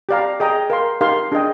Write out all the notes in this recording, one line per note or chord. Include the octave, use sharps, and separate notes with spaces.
G4 D5 F5 A#5
G#4 D#5 G5 A#5
A#4 F5 C6
D#4 G4 A#4 F5 C6
D4 G#4 D#5 G5